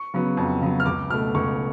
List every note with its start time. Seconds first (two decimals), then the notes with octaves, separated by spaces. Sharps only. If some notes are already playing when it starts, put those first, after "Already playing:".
Already playing: C#6
0.14 C#3 F#3 B3
0.37 F2
0.62 C#3 F#3 B3
0.80 F6
0.86 C#2 D6
1.10 B2 A3 F6
1.35 C#2 C#6